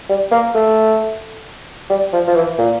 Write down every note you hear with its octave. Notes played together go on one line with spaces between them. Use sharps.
G3
A#3
A3
G3
F3
F3
E3
A#2